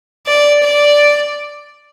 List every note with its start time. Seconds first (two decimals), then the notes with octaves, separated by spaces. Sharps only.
0.27 D5
0.64 D5